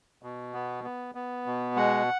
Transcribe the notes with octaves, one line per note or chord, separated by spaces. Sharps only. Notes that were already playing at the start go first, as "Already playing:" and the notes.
B2
B3
B3
B3
B2
G#3 F#5